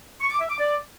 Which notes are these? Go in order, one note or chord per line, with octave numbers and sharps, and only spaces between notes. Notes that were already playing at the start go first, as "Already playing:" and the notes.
C#6
D6
E5
D6
D5